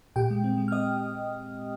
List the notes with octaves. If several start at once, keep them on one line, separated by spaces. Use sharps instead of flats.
A#2 G4 G5
G#3
C4
G#3
F6
C4 D#5 D#6